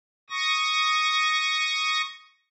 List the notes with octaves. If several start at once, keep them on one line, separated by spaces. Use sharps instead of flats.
C#6 D#6 A#6